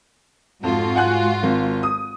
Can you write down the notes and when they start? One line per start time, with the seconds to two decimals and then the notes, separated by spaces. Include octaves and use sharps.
0.64 F2 G#2 F4 F#4
0.96 F#5 G#5 F#6
1.43 G#1
1.83 D#6